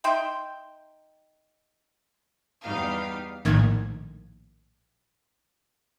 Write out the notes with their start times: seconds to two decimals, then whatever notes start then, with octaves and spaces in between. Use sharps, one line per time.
0.04 D#4 E5 G5 C6
2.62 E2 G3 D#4 G4 F5
3.45 A#1 A2 D#3 G#6